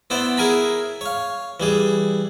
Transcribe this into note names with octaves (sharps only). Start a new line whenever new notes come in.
B3 E4 C5 D5
E4 G#4 A#4 G#5 A#5 B5
C#5 F5
E3 G3 G#4